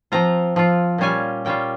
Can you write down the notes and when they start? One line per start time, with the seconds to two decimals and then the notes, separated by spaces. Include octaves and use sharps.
0.12 F3 C4 F4 A#5
0.56 F3 C4 F4
0.98 A#2 G3 C#4 F4 G#5
1.45 A#2 G3 C#4 F4 G5